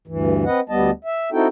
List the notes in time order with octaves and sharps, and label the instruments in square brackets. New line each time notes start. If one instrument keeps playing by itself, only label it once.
[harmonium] D2 G2 E3
C4 B4 D#5 F#5
D2 G3 B3 D#5 A5
E5
C4 D#4 E4 F#4 A4 G5